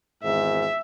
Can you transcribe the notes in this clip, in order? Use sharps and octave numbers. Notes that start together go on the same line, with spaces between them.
G#1 E2 G#2 E5